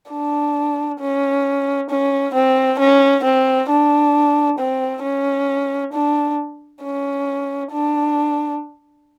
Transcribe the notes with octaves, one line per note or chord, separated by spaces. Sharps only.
D4
C#4
C#4
C4
C#4
C4
D4
C4
C#4
D4
C#4
D4